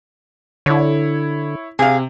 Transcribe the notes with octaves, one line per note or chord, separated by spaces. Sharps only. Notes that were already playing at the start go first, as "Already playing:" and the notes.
D3 E4 C#5
C3 G#4 F5